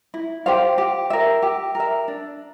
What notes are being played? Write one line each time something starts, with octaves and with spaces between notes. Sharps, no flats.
E4
G4 C5 F5
G4
A#4 E5
G4
A#4 E5
D4